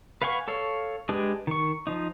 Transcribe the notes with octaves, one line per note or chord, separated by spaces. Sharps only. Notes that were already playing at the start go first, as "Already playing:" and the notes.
B4 F5 F#5 G#5 C#6
A4 C#5 F5
G#3 D4 G4 G#4 B4
D#3 C#6
F3 D#4